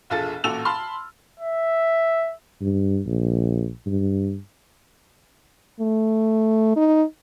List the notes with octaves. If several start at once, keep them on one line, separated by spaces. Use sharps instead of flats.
E1 A#1 F4 G#4 A4 A6
A1 A#2 F#4 A4 E6 F7
A5 B5 C6 F6
E5
G2
A#1
G2
A3
D#4